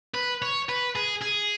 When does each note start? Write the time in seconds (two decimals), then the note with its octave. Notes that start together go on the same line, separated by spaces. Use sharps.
0.14 B4
0.42 C#5
0.69 B4
0.96 G#4
1.22 G#4